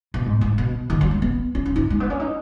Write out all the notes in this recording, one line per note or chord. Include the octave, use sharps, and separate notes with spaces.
B2
G#2
G#2
B2
D#3
F#3
G#3
B3
C#4
C#4
D#4
G#3
B3
C#4
D#4